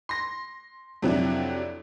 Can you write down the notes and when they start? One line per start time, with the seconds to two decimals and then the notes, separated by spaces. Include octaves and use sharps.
0.09 C6 A#6
1.02 F2 C3 F#3 C4 D4 E4